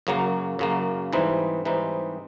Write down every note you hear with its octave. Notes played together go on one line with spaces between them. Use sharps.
F#2 C#3 F#3 A#3
F#2 C#3 F#3 A#3
G#2 E3 G3 C4 D#4
G#2 E3 G3 C4 D#4